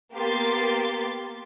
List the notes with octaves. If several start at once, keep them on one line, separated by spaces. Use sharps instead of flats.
A#3 B3 G4 C6 A6